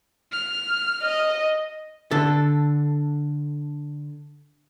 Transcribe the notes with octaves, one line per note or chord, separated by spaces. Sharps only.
F6
D#5
D3 A4